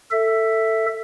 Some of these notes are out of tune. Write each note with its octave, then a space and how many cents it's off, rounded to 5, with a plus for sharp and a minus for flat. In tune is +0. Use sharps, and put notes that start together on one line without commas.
A4 +15 E5 +0